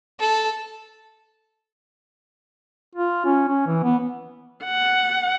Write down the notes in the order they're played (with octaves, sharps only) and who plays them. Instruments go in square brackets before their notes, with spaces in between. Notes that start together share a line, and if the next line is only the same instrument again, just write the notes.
[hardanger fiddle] A4
[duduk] F4
C#4
C#4
E3
B3
[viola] F#5